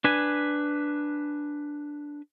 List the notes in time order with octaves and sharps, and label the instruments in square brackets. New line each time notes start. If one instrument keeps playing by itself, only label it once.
[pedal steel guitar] D4 B4 G#5